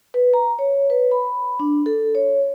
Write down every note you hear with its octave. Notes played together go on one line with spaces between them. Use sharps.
B4
A#5
C#5
B4
B5
D4
A4
C#5